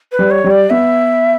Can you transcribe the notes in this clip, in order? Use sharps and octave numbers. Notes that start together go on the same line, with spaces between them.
B4
G3
C#5
G3
D5
B3 E5